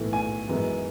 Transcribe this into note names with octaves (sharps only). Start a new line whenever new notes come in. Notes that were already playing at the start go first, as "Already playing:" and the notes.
Already playing: B1 A2 E3 A3
G#5
F#2 E3 G#3 B3